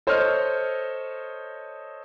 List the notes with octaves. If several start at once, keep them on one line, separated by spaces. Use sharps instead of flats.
A4 C5 C#5 D#5 F6